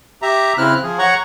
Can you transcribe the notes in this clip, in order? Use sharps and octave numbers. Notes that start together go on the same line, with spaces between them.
G4 E5 A#5
C#3 C4 E4 F6 F#6
F3 G#4
C#5 F#5 A#5 C#6